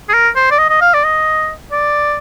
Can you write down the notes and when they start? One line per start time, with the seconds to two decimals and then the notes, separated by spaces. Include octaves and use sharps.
0.09 G#4
0.13 A#4
0.36 C5
0.51 D5
0.58 D#5
0.70 D#5
0.81 F5
0.94 D5
1.04 D#5
1.72 D5